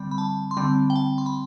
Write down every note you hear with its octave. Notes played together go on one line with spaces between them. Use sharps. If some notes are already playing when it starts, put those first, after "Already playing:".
Already playing: D3 G3 C4 B5
B5
A5
C6
D3 G3 C4 B5
G5
A5
C6
B5